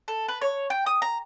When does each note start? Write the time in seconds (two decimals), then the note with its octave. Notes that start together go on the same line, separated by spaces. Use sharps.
0.08 A4
0.28 B4
0.42 C#5
0.70 G5
0.86 D#6
1.02 A#5